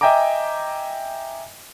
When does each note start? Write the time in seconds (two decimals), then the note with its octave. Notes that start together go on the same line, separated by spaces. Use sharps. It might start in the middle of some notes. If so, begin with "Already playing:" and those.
0.01 D#5 E5 G5 G#5 A#5 D6